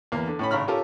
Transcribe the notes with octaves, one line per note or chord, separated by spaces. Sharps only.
E2 A#3
D3
A2 C#4 B5
G#1 C#3 A#5 B5 F6
C#4 F4 G4 A4 A#4